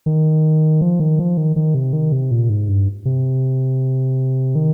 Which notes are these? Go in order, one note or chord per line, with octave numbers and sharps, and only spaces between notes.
D#3
F3
D#3
F3
D#3
D#3
C3
D#3
C3
A#2
G#2
G2
C3
D#3